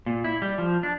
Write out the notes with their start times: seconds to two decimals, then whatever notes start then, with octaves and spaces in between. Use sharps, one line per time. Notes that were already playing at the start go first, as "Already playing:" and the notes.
0.06 A#2
0.24 E4
0.42 G3
0.58 F3
0.83 D4